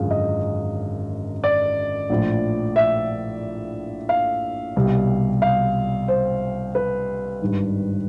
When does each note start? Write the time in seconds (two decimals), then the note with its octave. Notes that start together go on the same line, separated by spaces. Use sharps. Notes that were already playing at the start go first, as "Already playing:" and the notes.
Already playing: G#1 F#2 D3 F3 G#3 F5
0.11 D#5
1.44 D5
2.10 A#1 A2 F3
2.76 E5
4.09 F5
4.76 C2 B2 G3
5.42 F5
6.08 C5
6.75 B4
7.42 G#1 G2 D#3 G3